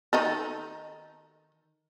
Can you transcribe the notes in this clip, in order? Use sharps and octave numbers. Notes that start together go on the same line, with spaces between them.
D#3 D#4 A4